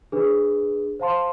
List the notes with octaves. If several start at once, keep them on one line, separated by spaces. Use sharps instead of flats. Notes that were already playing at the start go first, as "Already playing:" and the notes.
D4 G#4 B4
C5 F5 A5 C6